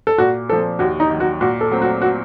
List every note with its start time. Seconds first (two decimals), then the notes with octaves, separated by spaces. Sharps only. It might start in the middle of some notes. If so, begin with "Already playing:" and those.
0.07 A4
0.18 A#2 F#4
0.49 F3 C4 A4
0.79 D#2 F#4
1.00 D#4
1.10 D#3 F#3
1.20 F#4
1.41 A#2 F#4
1.61 A4
1.71 F#3 A3 C4
1.82 F#4
2.01 F#4